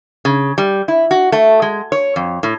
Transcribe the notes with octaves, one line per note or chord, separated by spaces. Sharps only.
C#3
G3
E4
F#4
A3
G#3
C#5
F2
A2